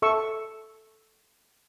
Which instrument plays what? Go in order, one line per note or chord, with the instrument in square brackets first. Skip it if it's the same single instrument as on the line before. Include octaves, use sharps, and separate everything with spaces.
[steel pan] A4 E5 C#6 E6